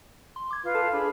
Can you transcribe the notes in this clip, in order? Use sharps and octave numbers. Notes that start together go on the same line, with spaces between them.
C6
D6 G#6
F4 B4
A4 F5 A5
D4 G#4 B5